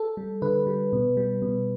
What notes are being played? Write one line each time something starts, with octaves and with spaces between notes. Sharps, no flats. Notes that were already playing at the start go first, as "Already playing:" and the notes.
Already playing: A4
G3
D3 B4
G3
B2
G3
B2